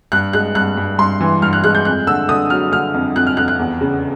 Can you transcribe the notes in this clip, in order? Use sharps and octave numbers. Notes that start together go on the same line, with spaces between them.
G2 F#6
G#3 F#6
G2 F#6
G2
G2 C6
E3
G2 F6
F#6
G#3 F#6
G6
F2 F#6
D3 E6
D3 D#6
F#3 F6
D3 F6
F2
F2 F#6
F6
F2 F#6
F#6
E2
C#3